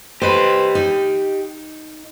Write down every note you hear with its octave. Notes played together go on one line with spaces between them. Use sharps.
G4 B4 C5 D#5
D#4